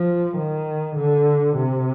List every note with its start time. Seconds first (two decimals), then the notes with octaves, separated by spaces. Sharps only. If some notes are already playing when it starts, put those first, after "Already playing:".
Already playing: F3
0.38 D#3
0.97 D3
1.57 C3